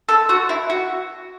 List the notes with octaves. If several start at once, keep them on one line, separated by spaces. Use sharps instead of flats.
A4
F#4
E4
F#4